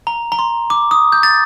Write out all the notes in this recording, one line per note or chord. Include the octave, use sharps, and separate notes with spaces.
A#5
A#5
C6
D6
D#6
G6
A6